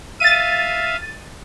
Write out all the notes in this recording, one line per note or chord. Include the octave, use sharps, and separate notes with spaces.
E5 F5 A6 D#7